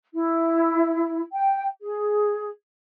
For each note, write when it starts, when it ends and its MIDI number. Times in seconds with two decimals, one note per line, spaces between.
0.13 1.20 64
1.31 1.66 79
1.82 2.49 68